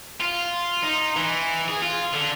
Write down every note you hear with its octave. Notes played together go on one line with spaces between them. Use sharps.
F4
D#4
E3
G#4
F4
D3